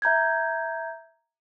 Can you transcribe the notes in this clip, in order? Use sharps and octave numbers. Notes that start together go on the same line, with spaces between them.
E5 A#5 G6 G#6